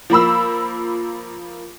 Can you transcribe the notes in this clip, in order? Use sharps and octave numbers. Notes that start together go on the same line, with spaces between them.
F3 A#3 B5 E6